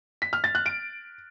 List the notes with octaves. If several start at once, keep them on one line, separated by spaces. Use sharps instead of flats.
B6
F6
A6
F#6
D7